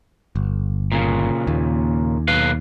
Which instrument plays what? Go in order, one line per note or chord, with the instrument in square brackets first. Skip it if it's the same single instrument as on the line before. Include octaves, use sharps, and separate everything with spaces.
[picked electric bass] G1
[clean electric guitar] A#2 C#3
[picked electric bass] D#2
[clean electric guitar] B1 B4 F5